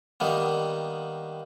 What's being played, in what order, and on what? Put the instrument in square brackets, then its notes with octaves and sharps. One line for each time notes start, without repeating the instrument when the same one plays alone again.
[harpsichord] D#3 G3 A#3 B3